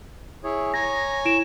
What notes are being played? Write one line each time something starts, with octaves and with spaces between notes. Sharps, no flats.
E4 G#4 C#5
C#5 G#5 A#5 A#6
E4 D7 E7